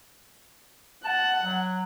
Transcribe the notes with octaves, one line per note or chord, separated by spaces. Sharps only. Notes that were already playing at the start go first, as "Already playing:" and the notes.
F#5 A5
F#3